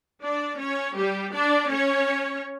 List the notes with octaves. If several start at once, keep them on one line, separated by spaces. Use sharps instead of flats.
D4 D5
C#4 C#5
G3 G4
D4 D5
C#4 C#5